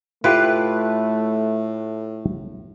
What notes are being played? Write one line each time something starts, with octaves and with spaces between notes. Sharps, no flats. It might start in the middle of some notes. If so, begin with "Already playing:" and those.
A2 A3 E4 F4 G4 B4